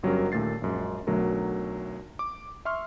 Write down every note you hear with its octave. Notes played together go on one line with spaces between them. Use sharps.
G1 F#3 G3 C#4 A#4
D#2 A#2 A3 A6 C7
A#1 F#2 G#3
B1 D3 F#3 A3 A#4
D6
E5 C6 C#6 F6